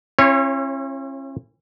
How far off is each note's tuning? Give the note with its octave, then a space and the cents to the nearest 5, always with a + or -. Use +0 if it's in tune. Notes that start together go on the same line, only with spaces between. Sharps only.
C#4 -40 E4 +40 C#5 -10